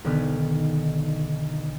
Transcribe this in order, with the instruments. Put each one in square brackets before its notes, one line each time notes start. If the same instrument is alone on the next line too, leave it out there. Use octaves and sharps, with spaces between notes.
[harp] B1 D3 D#3 B3 F6 G#6